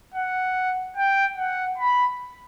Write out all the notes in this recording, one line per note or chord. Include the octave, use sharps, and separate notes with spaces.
F#5
G5
F#5
B5